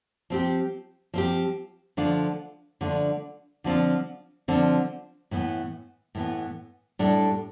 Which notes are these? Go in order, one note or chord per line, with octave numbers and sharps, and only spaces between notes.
F3 C4 G4
F3 C4 G4
D3 F3 A3 D4 F4
D3 F3 A3 D4 F4
D3 F3 C4 F4
D3 F3 C4 F4
A2 E3 B3
A2 E3 B3
A2 G3 D4 A4